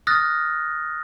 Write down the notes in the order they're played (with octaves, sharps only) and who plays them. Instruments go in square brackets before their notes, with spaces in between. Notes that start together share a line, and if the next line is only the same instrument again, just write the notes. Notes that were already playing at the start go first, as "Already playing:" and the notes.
[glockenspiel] D#6 F6 F#6 A6 A#6